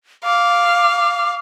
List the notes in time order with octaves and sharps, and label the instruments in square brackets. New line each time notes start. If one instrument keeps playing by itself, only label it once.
[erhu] F5 [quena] D6